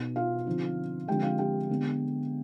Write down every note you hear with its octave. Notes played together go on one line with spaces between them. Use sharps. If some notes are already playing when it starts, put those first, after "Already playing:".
Already playing: B2 B3 D#4
F4 F5
D3 F3 C4 D#4
D3 F3 G#3 C4 G4 G5
F4 F5
G4 G5
D3 G#3 B3